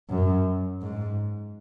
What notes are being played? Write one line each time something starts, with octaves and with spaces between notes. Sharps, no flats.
F#2
G#2